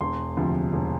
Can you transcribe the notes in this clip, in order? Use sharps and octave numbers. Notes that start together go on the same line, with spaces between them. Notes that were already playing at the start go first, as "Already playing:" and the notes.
E1 C6
D2 C3 F3
E1